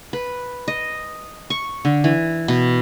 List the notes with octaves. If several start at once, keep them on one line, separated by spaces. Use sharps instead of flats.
B4
D#5
C#6
D3
E3
B2